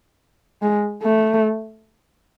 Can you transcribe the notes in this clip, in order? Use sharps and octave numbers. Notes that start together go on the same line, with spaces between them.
G#3
A3